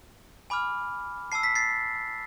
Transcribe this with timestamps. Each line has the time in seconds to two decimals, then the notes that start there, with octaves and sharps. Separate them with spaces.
0.50 G#5 B5 D6 F6
1.32 A5 E6 C7
1.43 B6
1.55 A6 C7